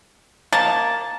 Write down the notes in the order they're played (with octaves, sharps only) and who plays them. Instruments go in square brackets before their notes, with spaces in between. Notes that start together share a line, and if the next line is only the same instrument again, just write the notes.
[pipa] A#3 [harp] A5 A6